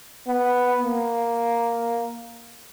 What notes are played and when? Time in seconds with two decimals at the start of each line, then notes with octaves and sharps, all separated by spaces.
0.27 B3
0.83 A#3